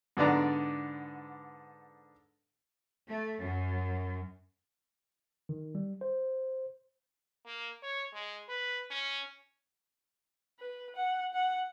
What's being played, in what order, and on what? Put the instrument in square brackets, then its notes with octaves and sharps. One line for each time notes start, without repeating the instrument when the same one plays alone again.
[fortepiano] G#2 D3 B3 D5 A#5
[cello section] A3
F#2
[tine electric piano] D#3
G3
C5
[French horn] A#3
C#5
G#3
B4
C#4
[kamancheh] B4
F#5
F#5